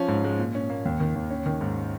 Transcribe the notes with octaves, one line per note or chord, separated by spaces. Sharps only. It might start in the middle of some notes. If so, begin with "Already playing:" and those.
Already playing: F3 C#4
G#2
G#3
A#2
C#4
A#3
D#2
D#3
D#2
C#4
D#3
G#2